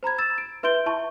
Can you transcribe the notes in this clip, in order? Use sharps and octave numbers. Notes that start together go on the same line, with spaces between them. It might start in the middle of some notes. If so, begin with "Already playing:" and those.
C5 A#5 B5 G#6
E6 A6 E7
D7
B4 E5 C6 G6 D7 G7
E4 E5 A5 C#6